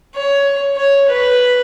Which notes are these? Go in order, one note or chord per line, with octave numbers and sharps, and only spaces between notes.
C#5
C#5
B4